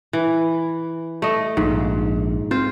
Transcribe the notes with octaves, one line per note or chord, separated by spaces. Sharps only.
E3
A3 D#5
A#1 G#2
C4 F4 C5